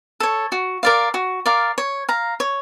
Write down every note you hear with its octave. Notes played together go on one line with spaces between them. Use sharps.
A4 C#5
F#4
A#4 D5 F5
F#4
A#4 D5 F5
C#5
F5 A#5
C#5